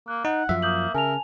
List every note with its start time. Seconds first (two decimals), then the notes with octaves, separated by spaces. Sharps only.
0.08 A#3 F#6
0.25 D#4 F#5
0.49 F#2 F3 E5
0.62 A#3 D#6 G6 F#7
0.94 C#3 A#4 G#5 A5 F7